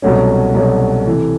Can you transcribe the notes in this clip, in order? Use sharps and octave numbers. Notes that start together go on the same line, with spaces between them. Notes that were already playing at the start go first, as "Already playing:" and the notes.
C2 B2 F#3 A3 C#4
C2 B2 F#3 A3 C#4
C3 E3 A3